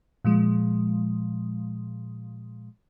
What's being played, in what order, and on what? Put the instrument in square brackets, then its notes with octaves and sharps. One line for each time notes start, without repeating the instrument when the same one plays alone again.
[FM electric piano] A#2 F3 G#3